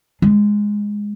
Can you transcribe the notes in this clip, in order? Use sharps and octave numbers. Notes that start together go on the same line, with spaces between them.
G#3